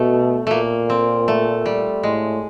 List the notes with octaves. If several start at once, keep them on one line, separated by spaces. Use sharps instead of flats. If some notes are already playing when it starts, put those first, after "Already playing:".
Already playing: B2 A3
A#2 A3 A#3
C4
A3
G3
A2 G#3